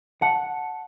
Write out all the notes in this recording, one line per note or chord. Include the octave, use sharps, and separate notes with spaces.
F#5 A5